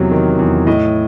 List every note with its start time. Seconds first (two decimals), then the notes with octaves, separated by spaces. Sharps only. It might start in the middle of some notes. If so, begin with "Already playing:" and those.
Already playing: E2 C3 D#3 F#3 C#5
0.11 D#3
0.39 E2
0.67 A2 D#5